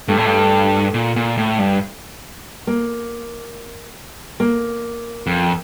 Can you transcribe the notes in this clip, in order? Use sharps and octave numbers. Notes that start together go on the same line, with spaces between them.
G2 A3
A2
G2
A#2
A#2
A2
G2
A#3
A#3
F2